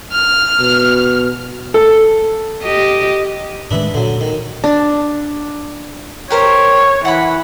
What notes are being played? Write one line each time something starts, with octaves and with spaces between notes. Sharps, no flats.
F6
B2
A4
G4 D#5
A2 D#3 G#3 D4 B4 E5
A#2 D3 F#3
D#3
D4
G4 A#4 C5 C#5
E3 F#5 B5